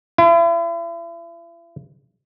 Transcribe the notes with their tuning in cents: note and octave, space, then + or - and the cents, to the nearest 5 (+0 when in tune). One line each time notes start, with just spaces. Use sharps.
E4 +40